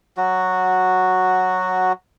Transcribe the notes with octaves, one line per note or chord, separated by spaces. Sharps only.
F#3 F#4